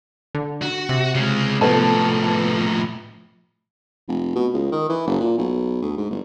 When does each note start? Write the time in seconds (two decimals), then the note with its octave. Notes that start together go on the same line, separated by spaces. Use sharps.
0.35 D3
0.62 F#4
0.89 C3
1.15 C#3 G#3
1.61 A2 F3 B3 A4 A5
4.08 F1
4.35 B2
4.54 C#2
4.72 D#3
4.89 E3
5.07 F#1
5.20 A#2
5.38 B1
5.82 D2
5.97 G#2
6.11 G1